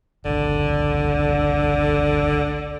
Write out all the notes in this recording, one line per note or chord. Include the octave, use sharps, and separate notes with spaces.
G1 C#2 D3